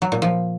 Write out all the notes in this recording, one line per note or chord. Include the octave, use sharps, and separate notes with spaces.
F#3
A#2
F3